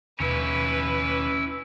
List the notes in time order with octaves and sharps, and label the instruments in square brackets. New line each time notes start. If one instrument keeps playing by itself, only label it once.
[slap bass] D#2 B2 D#3 [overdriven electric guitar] C#4 E4 [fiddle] B4